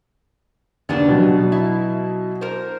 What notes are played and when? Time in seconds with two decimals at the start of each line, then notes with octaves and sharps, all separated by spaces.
0.89 D#2 C#3 B3 D4
1.08 B2 F#3
1.52 E4
2.41 A#4 C5